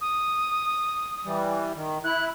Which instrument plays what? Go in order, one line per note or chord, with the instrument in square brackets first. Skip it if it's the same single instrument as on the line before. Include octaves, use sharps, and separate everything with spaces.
[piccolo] D#6
[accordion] E3 G3
D#3
[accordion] E4 [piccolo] F#6